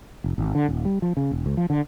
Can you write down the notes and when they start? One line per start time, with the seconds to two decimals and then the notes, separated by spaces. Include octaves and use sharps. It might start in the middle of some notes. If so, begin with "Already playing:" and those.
0.24 F1
0.38 G#1
0.55 D3
0.68 D#1
0.85 G3
1.02 F3
1.17 C#3
1.31 E1
1.46 C#2
1.57 F3
1.70 D3